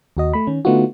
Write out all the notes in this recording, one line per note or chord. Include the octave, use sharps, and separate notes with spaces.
D#2 F#4 D#5
A3 B5
D#3 C#4
D3 A3 B3 D#4 F4 F#4